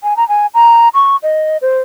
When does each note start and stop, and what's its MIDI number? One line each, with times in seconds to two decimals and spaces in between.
0.03 0.16 80
0.17 0.27 82
0.29 0.46 80
0.54 0.89 82
0.94 1.16 85
1.23 1.57 75
1.62 1.80 72